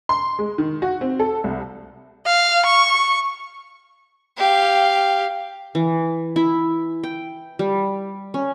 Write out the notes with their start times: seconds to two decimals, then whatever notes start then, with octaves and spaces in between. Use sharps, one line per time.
0.09 C6
0.39 G#3
0.58 D#3
0.82 F#4
1.01 C4
1.19 A4
1.44 C2
2.26 F5
2.66 C#6
4.37 G4 F5
5.75 E3
6.36 E4
7.04 G5
7.59 G3
8.34 C#4